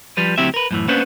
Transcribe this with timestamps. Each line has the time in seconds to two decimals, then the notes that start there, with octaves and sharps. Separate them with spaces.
0.17 F3 G3 B4
0.38 D2 F#3 C4 E4 G4 E5
0.54 A#4 B4
0.71 F#2 A2 E3
0.88 A#3 B3 C#4 D4 B4 C5